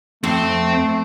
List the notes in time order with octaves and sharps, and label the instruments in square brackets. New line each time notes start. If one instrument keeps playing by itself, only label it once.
[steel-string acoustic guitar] F2 [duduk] A3 [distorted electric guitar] C4